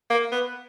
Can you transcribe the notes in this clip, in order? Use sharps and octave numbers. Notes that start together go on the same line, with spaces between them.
A#3
B3